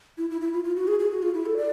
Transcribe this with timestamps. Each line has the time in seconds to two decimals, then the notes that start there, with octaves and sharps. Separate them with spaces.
0.18 E4
0.30 E4
0.41 E4
0.54 F4
0.64 F4
0.76 F#4
0.88 G#4
0.99 G#4
1.11 F#4
1.22 F4
1.34 E4
1.46 A4
1.57 D5